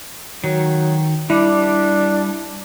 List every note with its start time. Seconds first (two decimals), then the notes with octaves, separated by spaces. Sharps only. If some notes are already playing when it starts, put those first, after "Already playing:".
0.44 D#3 F#3
1.30 G3 D4 E4